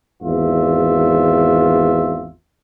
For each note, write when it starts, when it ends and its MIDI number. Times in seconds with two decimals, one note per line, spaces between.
0.22 2.29 32
0.22 2.29 40
0.22 2.29 65
0.22 2.29 76